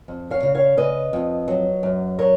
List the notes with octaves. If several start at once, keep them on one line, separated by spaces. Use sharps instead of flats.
F2
C#5 F5
C#3
C#5 F5
C#3 B4 D#5
F2
F#3
F#2
F#3 A#4 C#5